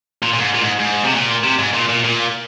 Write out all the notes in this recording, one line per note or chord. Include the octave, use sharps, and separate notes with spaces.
A#2
A#2
G#2
A#2
G#2
G#2
C3
A#2
C3
G#2
A#2
A#2
A#2